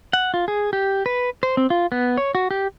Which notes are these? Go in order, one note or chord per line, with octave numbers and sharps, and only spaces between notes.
F#5
F4
G#4
G4
B4
C5
C4
F4
B3
C#5
F#4
G4